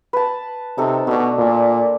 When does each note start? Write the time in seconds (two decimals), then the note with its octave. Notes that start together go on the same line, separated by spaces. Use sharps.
0.13 B4 A5
0.78 C3 D#4 A4
1.07 B2 A3 D4
1.38 A#2